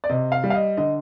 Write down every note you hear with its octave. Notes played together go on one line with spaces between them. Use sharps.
D5
C3 D#5
F5
G3
F5
D#5
D3 D#5